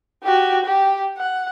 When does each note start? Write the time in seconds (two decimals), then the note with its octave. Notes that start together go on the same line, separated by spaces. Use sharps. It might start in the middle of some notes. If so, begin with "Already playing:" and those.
0.23 F#4 G4
0.65 G4
1.17 F#5